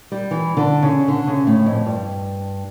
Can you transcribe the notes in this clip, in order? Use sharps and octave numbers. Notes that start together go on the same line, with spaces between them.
G3
E3
D3
C#3
D3
C#3
A2
F2
G2